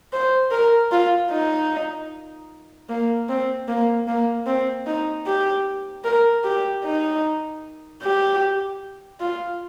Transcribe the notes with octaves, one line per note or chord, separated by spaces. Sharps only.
C5
A#4
F4
D#4
A#3
C4
A#3
A#3
C4
D#4
G4
A#4
G4
D#4
G4
F4